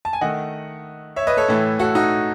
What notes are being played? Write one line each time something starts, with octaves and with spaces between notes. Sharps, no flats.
A5
G#5
D#3 A3 D#5 F#5
C#5 E5
B4 D#5
A4 C#5
A2 E3 A3
F#4 A4
D#4 F#4